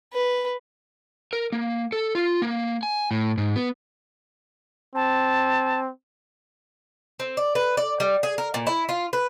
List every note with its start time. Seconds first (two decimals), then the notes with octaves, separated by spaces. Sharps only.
0.13 B4
1.33 A#4
1.52 A#3
1.92 A4
2.15 F4
2.42 A#3
2.83 G#5
3.11 A2
3.37 G#2
3.56 B3
4.95 C4 A5
7.20 C4
7.37 D5
7.55 B4
7.77 D5
8.00 G3
8.23 G#4
8.38 A#4
8.54 A#2
8.67 E4
8.89 F4
9.13 B4